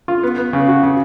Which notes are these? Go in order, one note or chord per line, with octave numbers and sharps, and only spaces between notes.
F4
B3
B3
C#3
F#4
C#3